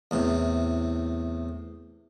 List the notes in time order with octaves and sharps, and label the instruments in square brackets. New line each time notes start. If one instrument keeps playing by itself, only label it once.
[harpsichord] E2 A2 C3